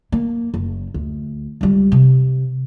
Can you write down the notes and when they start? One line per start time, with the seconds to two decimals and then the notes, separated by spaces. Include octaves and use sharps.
0.12 A#3
0.54 F#1
0.94 D2
1.61 C#2 G3
1.92 C3